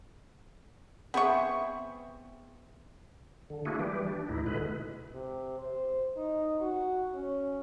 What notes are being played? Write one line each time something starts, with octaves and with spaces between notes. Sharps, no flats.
B3 C4 G#4 E5 C#6
D3
A3 A#3 D4 E4 F#4 G#4
E3 G3 G4
D4
D2 A2 D#4 E4
B2 D3 G#3 E4 B4
C3
C5
D#4
F#4
C#4